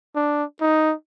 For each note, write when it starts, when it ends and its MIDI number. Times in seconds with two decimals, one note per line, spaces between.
0.15 0.44 62
0.61 0.94 63